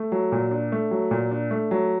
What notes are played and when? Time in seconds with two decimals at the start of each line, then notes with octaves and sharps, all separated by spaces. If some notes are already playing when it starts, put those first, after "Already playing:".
Already playing: A3
0.12 F#3
0.32 A#2
0.51 D4
0.72 A3
0.91 F#3
1.11 A#2
1.31 D4
1.51 A3
1.71 F#3